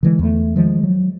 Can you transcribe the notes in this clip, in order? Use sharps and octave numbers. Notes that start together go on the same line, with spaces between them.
D3 E3 G#3
E2 A3
D#3 F3 G#3
F#3